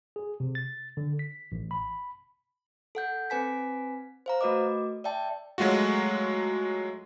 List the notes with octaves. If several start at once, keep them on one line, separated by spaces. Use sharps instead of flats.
G#4
C3
A6
D3
B6
A1
B5
A4 F#5 G6
C4 B4 G#5 B6
C5 F5 A#5
A3 F#4 B4 D#5 D6
D5 E5 G5 A5
F#3 G#3 A3 F4 F#4